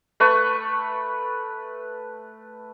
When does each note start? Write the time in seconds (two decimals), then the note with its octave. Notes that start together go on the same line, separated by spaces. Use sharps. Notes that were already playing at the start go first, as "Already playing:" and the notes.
0.20 A3 B4 C#6